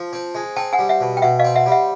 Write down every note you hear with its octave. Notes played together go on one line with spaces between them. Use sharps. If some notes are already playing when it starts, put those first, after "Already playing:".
Already playing: F3
C4
G#3
C4 G5 A5
F#5 G#5
G3
E5 F#5
B2
G5
B2 E5 F#5
D#5 F5
C4
E5 F#5
G3
E5 F#5